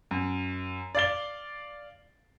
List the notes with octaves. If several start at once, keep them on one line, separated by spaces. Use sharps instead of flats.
F#2
D5 F5 A6 G7